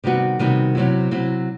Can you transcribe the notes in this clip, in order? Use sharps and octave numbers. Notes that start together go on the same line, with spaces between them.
C3 D#3 G3 B3 F#4
C3 D#3 G3 B3 F#4
C3 F#3 C4 E4
C3 F#3 C4 E4